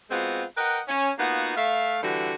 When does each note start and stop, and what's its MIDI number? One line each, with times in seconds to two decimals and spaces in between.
0.11 0.43 56
0.11 0.43 59
0.11 0.43 60
0.11 0.43 65
0.11 0.43 66
0.56 0.80 70
0.56 0.80 71
0.56 0.80 75
0.56 0.80 78
0.56 0.80 79
0.88 1.11 61
1.19 1.54 58
1.19 1.54 59
1.19 1.54 63
1.19 1.54 65
1.19 1.54 66
1.57 1.98 57
1.57 1.98 76
1.57 1.98 77
2.02 2.35 50
2.02 2.35 52
2.02 2.35 55
2.02 2.35 66
2.02 2.35 67